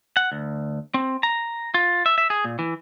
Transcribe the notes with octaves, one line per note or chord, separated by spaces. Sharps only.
F#5
D2
C4
A#5
F4
E5
E5
G#4
A#2
E3